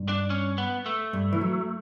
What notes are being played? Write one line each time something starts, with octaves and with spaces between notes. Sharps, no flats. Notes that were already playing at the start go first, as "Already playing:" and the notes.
Already playing: G2
D4
C#4
B3
A3
G2
E3
F#3